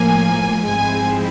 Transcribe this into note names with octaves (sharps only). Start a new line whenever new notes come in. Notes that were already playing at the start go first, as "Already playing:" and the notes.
Already playing: A2 F3 A#3 G#5
G#2 F3 G#3 C4 E4 G#5